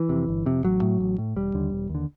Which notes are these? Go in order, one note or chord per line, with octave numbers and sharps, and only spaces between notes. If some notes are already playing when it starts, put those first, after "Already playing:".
Already playing: E3
F2 C3
G1
F2 C3
A1 F#3
A2
A1
A2
E1 G3
D#2 D3
E1
D#2
D3